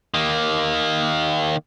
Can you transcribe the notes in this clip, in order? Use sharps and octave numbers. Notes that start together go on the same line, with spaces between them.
D#3 A#3